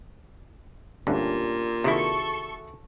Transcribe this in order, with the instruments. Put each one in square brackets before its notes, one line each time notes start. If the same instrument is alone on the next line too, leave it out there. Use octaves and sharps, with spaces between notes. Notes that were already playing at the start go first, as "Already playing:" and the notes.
[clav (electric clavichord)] D2 G2 D3 [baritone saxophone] A#2 [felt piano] C#4 D4 G4
[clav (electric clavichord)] C3 D#3 E4 [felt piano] F#4 G#4 E5 [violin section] A4 C#6